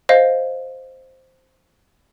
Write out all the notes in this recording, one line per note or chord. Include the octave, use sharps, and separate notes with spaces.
C5 D#5 F5